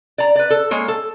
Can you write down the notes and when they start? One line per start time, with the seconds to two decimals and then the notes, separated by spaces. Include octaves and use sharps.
0.18 D5 A#5
0.36 B4 D5
0.50 A4
0.71 G#3 A#3 C#5
0.88 A4